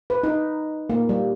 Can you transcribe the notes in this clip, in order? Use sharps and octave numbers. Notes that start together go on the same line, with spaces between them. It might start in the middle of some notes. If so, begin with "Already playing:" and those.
B4
D#4
A#3
G3